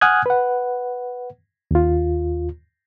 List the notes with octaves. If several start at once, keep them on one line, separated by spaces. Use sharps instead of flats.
F#5 G#5 D#6 F6 F#6 G#6
B4 F#5
D#2 F4